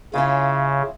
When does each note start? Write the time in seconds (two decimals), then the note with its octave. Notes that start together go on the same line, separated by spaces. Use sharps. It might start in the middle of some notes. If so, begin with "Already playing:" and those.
0.13 C#3 C#4 E4 F4